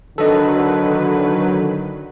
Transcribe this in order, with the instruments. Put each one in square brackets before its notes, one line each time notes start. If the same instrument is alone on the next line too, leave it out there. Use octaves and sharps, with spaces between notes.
[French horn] D3 [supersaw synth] D#3 F#3 B4 [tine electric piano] A4 D#5